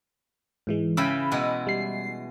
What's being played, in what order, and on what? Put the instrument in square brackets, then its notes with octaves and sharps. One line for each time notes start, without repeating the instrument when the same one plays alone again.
[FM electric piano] G#2 E3 G#3
[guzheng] C#3 E3 G5 [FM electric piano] B5 E6
[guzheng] B2 G#3 E4
[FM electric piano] G3 C7